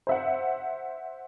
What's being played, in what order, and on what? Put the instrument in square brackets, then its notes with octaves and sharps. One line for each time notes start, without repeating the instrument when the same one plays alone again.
[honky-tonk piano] C5 E5 F#5